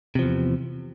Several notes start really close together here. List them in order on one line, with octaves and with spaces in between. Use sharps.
C3 F3 E2